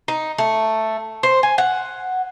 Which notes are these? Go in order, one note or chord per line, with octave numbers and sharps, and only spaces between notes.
D#4
A3
C5
G#5
F#5